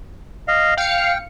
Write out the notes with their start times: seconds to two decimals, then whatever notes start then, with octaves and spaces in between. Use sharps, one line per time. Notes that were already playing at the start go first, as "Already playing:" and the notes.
0.48 D#5 F5
0.77 F5 G5 C#7